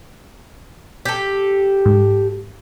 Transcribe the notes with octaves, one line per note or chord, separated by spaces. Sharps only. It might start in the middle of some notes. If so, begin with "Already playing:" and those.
G4 A4
G#2